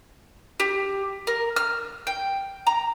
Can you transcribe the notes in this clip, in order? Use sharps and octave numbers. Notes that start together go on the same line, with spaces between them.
G4
A#4
F6
G5
A#5